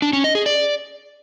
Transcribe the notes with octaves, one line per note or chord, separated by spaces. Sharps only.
D4
C#4
D#5
G#4
D5